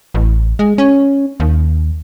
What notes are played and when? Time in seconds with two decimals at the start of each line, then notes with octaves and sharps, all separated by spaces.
0.14 A1
0.59 G#3
0.78 C#4
1.40 D#2